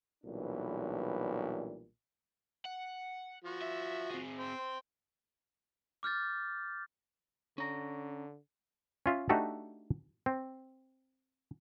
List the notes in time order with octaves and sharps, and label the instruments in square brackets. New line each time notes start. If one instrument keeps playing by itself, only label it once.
[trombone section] B1 A#2 E3 G3 D4
[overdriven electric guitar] F#5
[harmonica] F3 F#4
[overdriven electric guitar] E5
C4 G#4
[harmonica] C5 G5
[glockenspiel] D6 F6 G6 A6
[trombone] D3 [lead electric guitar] C#4 A#5
[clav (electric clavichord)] C#4 F4 E5
A3 D4 D#4 F#4 G4 A4
C4